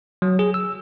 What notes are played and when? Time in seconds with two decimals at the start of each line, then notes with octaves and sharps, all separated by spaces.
0.22 F#3
0.39 G#4
0.54 E6